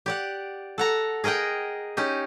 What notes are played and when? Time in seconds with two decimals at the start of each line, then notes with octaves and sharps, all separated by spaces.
0.06 G4 D5 F#5
0.78 A4 F#5 A#5
1.24 G#4 A#4 D#5 F#5 G5
1.97 C#4 D#4 G4